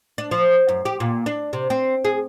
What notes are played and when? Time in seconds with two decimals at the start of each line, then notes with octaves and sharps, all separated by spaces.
0.18 D4
0.31 F3
0.69 F#2
0.85 G4
1.00 A#2
1.26 D4
1.53 C3
1.70 C4
2.04 G#4